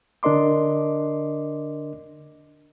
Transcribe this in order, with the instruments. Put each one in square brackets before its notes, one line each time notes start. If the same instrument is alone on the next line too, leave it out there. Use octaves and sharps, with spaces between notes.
[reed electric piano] D3 D4 A#4 D#5 C6 D6